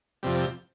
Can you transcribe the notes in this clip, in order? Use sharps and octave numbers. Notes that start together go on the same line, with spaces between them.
F2 C3 G3